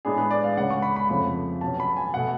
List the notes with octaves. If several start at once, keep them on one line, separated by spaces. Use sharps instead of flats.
A2 G#3 B3 D4 G#4
B4
D5
F5
C#2 C#3 G#3 C#4 F#5
C#6
B5
B5
F2 C#3 F3 A3 C#4 B5
B2 F#3 C#4 A5
B5
G#5
B2 A3 F#5